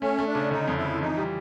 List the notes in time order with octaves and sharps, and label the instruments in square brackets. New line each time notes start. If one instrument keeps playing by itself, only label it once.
[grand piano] A3 [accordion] C#4
[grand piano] A3
[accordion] D4
[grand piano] C#3
[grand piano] D3 [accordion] D#4
[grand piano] F2
[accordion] E4
[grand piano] F3
[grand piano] E3 [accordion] D#4
[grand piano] G3